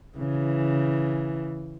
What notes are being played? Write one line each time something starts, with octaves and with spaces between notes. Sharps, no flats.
C#3 E3